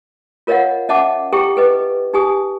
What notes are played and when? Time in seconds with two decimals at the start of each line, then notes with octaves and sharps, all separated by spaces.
0.47 F4 A#4 C#5 D#5 F5 F#5
0.89 C#4 D#5 E5 F#5 A5 D6
1.32 E4 G4 A4 G5 C#6
1.57 A4 B4 D#5
2.14 D#4 G4 G#5 D#6